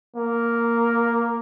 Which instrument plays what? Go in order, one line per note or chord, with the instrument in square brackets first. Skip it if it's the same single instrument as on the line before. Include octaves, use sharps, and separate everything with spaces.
[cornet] A#3